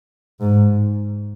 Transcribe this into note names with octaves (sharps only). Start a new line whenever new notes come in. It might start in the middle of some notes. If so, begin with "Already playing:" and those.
G#2